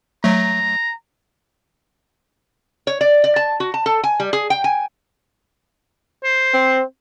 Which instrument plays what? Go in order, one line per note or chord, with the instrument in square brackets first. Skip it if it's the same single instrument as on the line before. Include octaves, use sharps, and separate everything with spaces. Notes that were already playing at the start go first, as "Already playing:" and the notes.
[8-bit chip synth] F#3 A3 [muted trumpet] A#5
[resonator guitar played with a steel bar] C#5
D5
D5
A5
F#4
A5
A4
G#5
G3
G#4
G5
G#5
[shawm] C5
[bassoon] C4